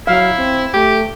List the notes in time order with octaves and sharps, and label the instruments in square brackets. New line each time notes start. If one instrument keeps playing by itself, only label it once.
[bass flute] F#3 [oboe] E4 [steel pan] F5
[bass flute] C4
[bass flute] A3 [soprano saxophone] G4